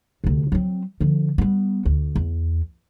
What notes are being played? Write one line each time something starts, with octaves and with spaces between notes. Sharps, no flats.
D2 C3
F#3 C4
D3 F3
G3 B3
D2
E2